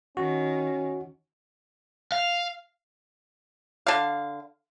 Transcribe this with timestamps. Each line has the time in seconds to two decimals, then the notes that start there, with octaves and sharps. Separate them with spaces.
0.17 D#3 C#4 F#4
2.12 F5
3.87 D3 F5